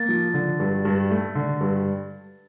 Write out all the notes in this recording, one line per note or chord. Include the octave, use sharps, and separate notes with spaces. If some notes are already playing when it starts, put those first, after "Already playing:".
Already playing: A#3 A6
F3
D3
G2
G2
A3
D3
G2